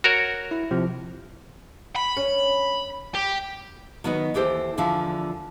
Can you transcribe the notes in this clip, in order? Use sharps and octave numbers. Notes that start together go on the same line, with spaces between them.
F#4 A#4 C#5
E4
C3 F3
B5
C#4
G4
D#3 F#3 B3 F#4 B4 D#5
D#2 E3 G4 A4 C5
E2 D3 F3 E4 F5